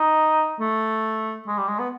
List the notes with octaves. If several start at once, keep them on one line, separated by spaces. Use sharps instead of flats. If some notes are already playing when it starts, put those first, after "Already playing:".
Already playing: D#4
A3
G#3
G3
G#3
B3